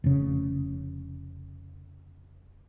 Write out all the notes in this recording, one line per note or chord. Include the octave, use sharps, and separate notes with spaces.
F1 C#3